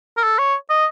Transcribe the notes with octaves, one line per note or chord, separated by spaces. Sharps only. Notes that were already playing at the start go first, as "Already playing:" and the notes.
A#4
A4
C#5
D#5